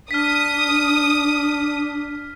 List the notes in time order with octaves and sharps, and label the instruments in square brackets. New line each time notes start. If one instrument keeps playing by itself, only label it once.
[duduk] D4 [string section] D#6 [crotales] F6 B6